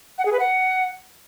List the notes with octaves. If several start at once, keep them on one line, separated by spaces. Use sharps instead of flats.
F#5
G#4
B4
F#5